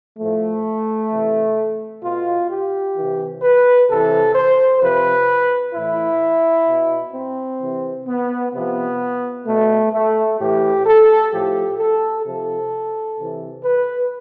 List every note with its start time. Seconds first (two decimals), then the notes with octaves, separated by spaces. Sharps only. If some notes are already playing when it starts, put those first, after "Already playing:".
0.17 A2 F3 A3
1.10 C3 E3
2.03 B2 F4
2.49 G4
2.96 C3 E3
3.41 B4
3.89 C3 E3 A4
4.35 C5
4.81 C3 F3 B4
5.74 A2 E3 E4
6.67 B2
7.13 C4
7.60 C3 E3
8.07 B3
8.53 C3 F3 B3
9.45 B2 A3
9.92 A3
10.39 A2 E3 G4
10.86 A4
11.31 A2 F3 G4
11.77 A4
12.24 C3 F3 A4
13.17 C3 E3
13.63 B4